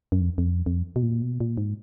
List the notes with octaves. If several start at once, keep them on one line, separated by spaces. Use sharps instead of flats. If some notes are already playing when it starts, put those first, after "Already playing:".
F#2
F2
F2
F2
B2
A#2
B2
A#2
G#2